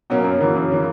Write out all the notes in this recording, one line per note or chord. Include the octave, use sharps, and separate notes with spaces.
B2 F#3 A#3 C#4
F#2
C#3 E3 A#3
F#2
C#3 E3 A#3